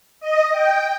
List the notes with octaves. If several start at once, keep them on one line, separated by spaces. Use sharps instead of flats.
D#5
G5